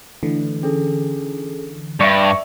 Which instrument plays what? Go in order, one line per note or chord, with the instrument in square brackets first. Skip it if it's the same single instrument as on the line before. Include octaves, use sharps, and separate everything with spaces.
[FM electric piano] D3 E3 [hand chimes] A3
[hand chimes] C#4 G#4 A4
[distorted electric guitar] G2 [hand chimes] D5 E5 [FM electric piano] C#6